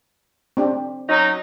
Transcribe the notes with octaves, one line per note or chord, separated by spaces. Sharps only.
C4 D4 G4
F#3 C#4 D#4